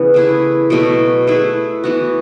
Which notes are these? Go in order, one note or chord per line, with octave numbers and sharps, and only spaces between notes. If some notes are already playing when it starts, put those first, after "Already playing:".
Already playing: C#3 E3 B3
A3 E4 G#4 B4
B2 F#3 A3 E4
A3 E4 G#4 B4
E3 B3 F#4